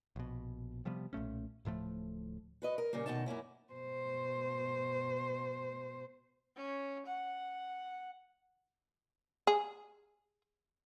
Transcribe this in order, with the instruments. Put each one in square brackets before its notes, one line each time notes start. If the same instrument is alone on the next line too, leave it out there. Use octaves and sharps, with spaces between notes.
[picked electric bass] A#1 B2
C3 F3 G3 B3
B1 A#2 A3 C#4
D1 A2 F3 A3
[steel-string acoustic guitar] F#4 B4 D#5
A#4
A#2 C#3 G3 A#3
D2 B2 D#3 C#4 D#4 A5
F#2 A#3 C#4 E4
[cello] B2 C5
[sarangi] C#4
F#5
[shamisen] G#4